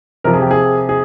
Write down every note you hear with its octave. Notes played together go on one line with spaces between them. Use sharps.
C3 F3 A#4
G#4
G4
G#4
G#4